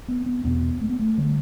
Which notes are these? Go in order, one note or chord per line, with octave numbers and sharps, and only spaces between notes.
B3
B3
E2 B2 B3
A3
B3
A3
D3 G3